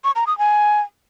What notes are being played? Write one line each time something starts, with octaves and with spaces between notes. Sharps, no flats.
C#6
A#5
D#6
G#5